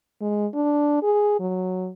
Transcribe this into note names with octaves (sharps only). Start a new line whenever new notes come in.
G#3
D4
G#4
F#3